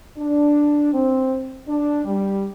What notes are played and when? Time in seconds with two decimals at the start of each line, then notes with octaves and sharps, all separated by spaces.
0.17 D4
0.92 C4
1.68 D4
2.05 G3